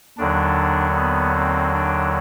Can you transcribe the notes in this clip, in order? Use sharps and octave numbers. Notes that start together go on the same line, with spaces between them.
D#2 D3 F#3 D4
B3
C4
D4